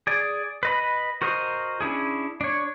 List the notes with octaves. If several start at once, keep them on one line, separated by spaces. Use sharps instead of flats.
G#4 D5
B4 D#5 B5
F#4 A#4 C5 D#5
C#4 D4 E4 G#4
D4 C#5